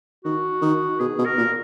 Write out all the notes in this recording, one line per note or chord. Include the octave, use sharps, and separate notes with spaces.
D#3 F#4
D#3
B2 G#4
B2
A#4
A#2